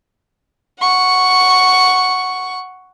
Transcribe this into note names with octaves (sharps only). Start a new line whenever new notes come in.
F#5 C#6